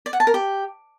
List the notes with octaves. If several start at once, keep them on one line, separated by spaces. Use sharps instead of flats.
D5
F#5
A5
A#4
G4